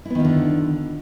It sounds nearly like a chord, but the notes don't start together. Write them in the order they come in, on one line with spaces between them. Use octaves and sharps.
E4 B3 D#3 F4 D3